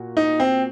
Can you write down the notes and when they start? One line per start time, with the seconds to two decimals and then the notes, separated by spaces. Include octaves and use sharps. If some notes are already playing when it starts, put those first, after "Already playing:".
Already playing: A#2 A#3 F#4
0.17 D#4
0.40 C4